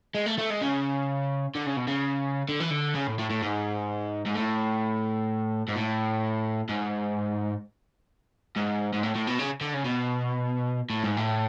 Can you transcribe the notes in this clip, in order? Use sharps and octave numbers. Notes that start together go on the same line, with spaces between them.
G#3
A3
A3
G#3
C#3
D3
C#3
B2
C#3
D3
E3
D3
C#3
A2
A2
A2
G#2
G#2
A2
G#2
A2
G#2
G#2
G#2
A2
A2
B2
C#3
D3
C#3
B2
A2
G#2
A2